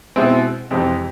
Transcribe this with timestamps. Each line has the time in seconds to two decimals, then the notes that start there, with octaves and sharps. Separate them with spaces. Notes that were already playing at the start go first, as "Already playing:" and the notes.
0.16 B2 G#3 C4 E4
0.71 F2 C3 E3 G#3 C4